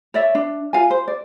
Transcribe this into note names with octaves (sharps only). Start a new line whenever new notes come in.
C#5 D5 E5
D4
F4 F5 G#5
C5
D5